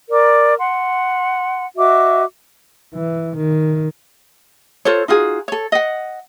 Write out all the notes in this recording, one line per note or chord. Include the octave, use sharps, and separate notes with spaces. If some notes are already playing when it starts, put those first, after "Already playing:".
A#4 D5 D6
F#5 C6
F#4 D#5 E5 D6
E3
D#3
F4 A4 C5 C#5
D#4 F4 F#4 G#4
A4 C#5
D#5 F#5